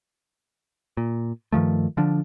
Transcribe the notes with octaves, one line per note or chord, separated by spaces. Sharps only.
A#2
G2 D#3 F3 A3
D3 F3 D4